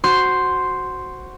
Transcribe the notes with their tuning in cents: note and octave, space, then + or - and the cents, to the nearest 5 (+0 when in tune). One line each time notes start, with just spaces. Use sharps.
F#4 +0 C5 +0 C6 +0